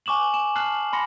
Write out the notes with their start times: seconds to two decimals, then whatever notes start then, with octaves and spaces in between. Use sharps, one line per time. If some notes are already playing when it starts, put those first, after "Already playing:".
0.06 G#5 C#6 D6 E7 F#7
0.33 G#5 E7
0.56 A5 F6 F#6 C7 F#7
0.92 G#5 B5 C6 A#6 C#7